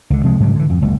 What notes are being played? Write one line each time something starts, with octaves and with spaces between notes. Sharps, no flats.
C#2 D3
C3 F3 G#3
G#2 C#3 F#3 G3
D3 E3
F2
F#1 C#2